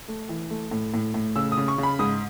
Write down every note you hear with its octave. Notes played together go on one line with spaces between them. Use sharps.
A3
E3
A3
A2
A2
A2
C#3 E6
D#6
C#3
C#6
C#3
B5
G#2 D#6